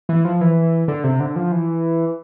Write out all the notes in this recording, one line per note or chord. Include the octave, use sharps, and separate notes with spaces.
E3
F3
E3
D3
C3
D3
F3
E3